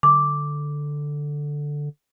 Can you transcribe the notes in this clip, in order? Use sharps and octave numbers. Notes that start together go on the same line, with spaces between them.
D3 D6